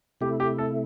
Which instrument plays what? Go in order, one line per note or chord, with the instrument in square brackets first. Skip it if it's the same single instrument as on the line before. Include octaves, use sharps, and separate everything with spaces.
[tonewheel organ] C3 A3 E4 [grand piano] G4
[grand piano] G4
A4